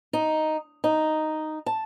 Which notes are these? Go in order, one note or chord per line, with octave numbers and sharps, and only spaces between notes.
D#4
D#4
A5